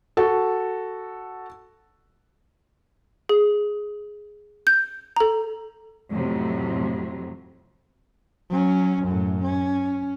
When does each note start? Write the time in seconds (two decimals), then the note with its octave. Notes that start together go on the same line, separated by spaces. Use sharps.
0.17 F#4 A4
3.29 G#4
4.67 G6
5.16 A4 A#5
6.12 F2 A2 C3 F#3
8.50 F#3 C#4
9.04 F#2 A2
9.43 C#4